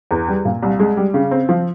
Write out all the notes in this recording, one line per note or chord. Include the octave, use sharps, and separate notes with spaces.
E2
G3
A#2
C2
G#3
G3
C#3
C4
F3